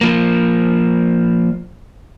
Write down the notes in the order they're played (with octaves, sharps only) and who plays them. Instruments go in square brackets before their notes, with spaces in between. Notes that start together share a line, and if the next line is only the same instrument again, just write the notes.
[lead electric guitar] F3 A#3